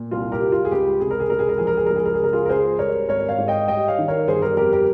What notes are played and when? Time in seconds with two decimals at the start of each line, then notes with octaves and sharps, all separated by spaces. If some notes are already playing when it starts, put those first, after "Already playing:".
Already playing: A#2
0.11 C2 F4
0.32 G4 A#4
0.41 G3
0.52 F4
0.65 G#4
0.71 C#2 G4
1.00 C3 G#4
1.11 A#4
1.20 G#4
1.30 C#2 A#4
1.39 G#4
1.49 A#4
1.58 F3 G#4
1.67 A#4
1.77 G#4
1.86 C#2 A#4
1.96 G#4
2.05 A#4
2.14 G#4
2.19 C#3 A#4
2.33 F4 G#4
2.46 A#4
2.49 C#2 G#4 C5
2.79 G3 A#4 C#5
3.09 G#1 A#4 C#5
3.29 C#5 F5
3.38 G#2
3.48 D#5 G5
3.68 G3 D#5 G5
3.88 C#5 F5
3.99 D#3
4.08 A#4 C#5
4.27 G1 G#4 C5
4.42 G4 A#4
4.57 F2 G4 A#4
4.73 G4 A#4